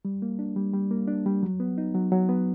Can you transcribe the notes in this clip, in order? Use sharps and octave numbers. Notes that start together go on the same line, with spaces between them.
G3
A#3
D4
G3
G3
A#3
D4
G3
F#3
B3
D#4
F#3
F#3
B3